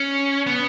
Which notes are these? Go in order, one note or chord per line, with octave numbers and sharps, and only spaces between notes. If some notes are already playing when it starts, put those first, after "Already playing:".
Already playing: C#4
B3